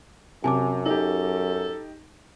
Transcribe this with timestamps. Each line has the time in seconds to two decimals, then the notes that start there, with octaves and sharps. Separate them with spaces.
0.44 F#2 C3 G#5 A5 D6
0.86 D#4 G4 A4